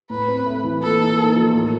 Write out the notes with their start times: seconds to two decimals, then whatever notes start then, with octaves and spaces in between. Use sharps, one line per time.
0.10 A2 B4
0.28 C4
0.46 A3
0.64 E3
0.82 A#2 A4
1.00 D#4
1.18 A#3
1.36 F3
1.55 A2